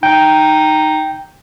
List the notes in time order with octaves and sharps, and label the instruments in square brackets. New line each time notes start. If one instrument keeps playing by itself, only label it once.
[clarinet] D#4 [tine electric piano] G5